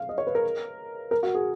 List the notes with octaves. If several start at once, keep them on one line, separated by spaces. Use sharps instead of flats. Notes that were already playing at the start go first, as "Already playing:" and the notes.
Already playing: F5
D#5
C#5
B4
A#4
A#4
F#4
G#4